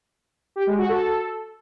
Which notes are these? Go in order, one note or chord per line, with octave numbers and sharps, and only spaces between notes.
G4
G#3
F#4
A4